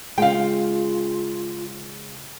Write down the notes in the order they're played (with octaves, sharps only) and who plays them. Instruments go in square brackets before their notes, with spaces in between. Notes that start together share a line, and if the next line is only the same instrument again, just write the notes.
[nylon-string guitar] C#3 G#3 [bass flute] F4 [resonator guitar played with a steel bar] F5 G5